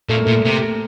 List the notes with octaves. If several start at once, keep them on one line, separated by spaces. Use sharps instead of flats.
A#2 A3
A#3
A#2 A3
C3